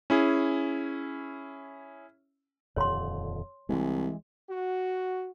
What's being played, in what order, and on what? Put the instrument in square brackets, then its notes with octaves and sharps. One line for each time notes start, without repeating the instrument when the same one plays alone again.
[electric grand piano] C#4 E4 G#4
[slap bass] D#1 F2 D3 [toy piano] C#5 C6
[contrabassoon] C2 [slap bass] E3 G#3
[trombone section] F#4